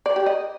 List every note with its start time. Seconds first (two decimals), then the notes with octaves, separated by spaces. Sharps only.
0.06 D5
0.16 G4
0.26 D#5